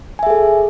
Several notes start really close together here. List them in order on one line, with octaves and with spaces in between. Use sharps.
G#5 E5 G#4 A4